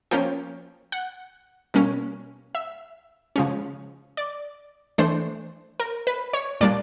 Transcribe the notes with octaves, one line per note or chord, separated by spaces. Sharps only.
F3 A#3 C#4 G5
F#5
B2 G3 A#3 C#4
E5
C#3 F3 G#3 C#4
D5
E3 A3 D4 C5
A#4
B4
C#5
A#2 G3 A#3 D4 D5